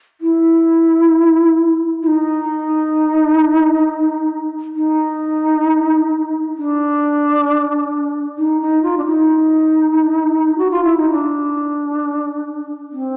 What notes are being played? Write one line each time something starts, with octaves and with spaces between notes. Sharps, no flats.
E4
E4
D#4
D#4
D4
D#4
D#4
F4
D4
D#4
F#4
F4
E4
D#4
D4
C4